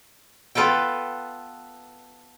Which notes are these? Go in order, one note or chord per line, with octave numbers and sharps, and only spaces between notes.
B3 F4 A4 B4 G5